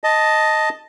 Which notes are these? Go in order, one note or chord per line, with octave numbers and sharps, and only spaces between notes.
D#5 A5